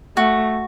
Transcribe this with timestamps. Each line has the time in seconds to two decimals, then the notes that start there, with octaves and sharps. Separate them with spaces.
0.17 A3 F#4